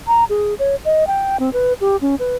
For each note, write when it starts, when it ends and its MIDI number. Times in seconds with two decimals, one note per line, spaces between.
0.07 0.24 82
0.30 0.54 68
0.59 0.75 73
0.85 1.07 75
1.07 1.37 79
1.40 1.52 60
1.53 1.73 71
1.81 1.97 67
2.01 2.15 61
2.19 2.36 71